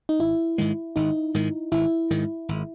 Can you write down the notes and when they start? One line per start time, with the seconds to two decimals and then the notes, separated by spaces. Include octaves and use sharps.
0.09 D#4
0.19 G#1 E4
0.58 G#2 D#3 G#3
0.96 G#1 D#4
1.34 G#2 D#3 G#3
1.71 G#1 E4
2.11 G#2 D#3 G#3
2.49 G#1